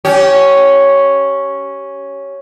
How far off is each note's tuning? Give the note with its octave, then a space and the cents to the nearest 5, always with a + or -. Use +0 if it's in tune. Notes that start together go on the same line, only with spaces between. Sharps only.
C#4 +0 G4 -25